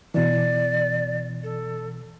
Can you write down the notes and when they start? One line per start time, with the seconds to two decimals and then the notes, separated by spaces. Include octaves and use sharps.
0.14 B2 E3 D5
1.43 A4